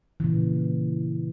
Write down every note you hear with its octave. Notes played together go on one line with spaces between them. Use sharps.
A#2 C#3 E3